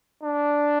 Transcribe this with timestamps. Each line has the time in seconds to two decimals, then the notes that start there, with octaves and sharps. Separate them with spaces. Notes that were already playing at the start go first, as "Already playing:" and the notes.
0.23 D4